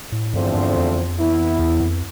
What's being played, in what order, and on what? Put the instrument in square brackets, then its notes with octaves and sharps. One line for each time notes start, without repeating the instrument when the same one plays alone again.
[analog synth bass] A2
[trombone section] E2 D3 F3 A3 C4 [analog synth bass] G2
[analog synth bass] G2
F2
[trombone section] E3 B3 E4
[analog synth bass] E2
F2